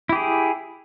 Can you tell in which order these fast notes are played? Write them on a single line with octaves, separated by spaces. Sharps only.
E4 G4 G#4